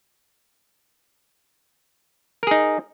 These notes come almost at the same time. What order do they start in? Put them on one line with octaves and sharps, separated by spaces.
A#4 G#4 D#4